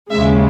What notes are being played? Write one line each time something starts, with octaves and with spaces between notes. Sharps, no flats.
D#2 C#3 G#3 E5